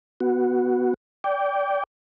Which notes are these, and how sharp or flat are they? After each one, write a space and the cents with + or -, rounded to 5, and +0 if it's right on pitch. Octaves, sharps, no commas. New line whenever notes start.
B3 +0 F#4 +0
D5 -25 G5 +0